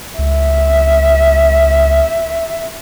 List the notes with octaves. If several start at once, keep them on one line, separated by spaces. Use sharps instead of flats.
C#2 E5